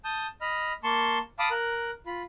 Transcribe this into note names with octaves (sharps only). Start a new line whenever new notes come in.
A5 D#6 G6
D#5 B5 F6
A#3 A5 C6 C#6
F5 A5 B5 D6 D#6
A#4 F#6
F4 B5